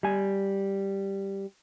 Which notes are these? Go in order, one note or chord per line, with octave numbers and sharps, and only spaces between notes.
G3 G#5